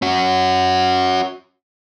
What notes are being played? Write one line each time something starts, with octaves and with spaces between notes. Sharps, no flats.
C#4 F#4